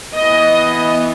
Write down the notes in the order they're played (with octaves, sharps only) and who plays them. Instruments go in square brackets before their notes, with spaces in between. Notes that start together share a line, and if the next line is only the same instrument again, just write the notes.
[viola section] E3 B3 D#5